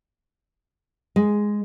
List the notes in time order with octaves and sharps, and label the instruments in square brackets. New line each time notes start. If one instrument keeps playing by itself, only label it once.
[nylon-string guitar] G#3